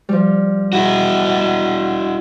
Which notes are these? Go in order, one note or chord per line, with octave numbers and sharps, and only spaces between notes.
F3 G3
E4 F#4